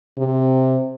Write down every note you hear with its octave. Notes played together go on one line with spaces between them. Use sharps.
C3